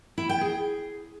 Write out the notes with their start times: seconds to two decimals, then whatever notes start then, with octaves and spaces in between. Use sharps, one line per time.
0.18 E4
0.29 G5
0.41 G#4